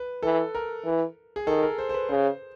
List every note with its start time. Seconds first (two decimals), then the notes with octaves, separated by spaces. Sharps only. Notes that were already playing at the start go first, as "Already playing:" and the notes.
Already playing: B4
0.23 E3 A4
0.55 A#4
0.85 E3
1.36 G#4
1.47 D#3 A4
1.63 A#4
1.78 C5
1.89 C5
1.94 B4
2.09 C#3 C5